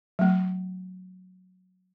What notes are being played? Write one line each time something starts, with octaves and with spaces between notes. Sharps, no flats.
F#3 A3